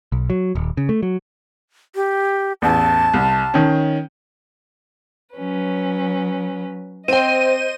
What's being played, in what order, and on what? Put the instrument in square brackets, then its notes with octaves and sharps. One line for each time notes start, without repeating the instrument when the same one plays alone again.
[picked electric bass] B1
F#3
D#1
C#3
A3
F#3
[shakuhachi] G4
[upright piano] A1 E2 [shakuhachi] A5
[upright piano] C2
D#3 C#4
[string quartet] F#3 C#4 B4
[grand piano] C4 G5 [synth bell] C5 D#7 [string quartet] D#5